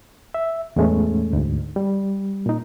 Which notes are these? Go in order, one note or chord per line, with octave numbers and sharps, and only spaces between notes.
E5
E2 A2 E3 G#3 A3 C#4
D2 G#2
G3
A#2 D#4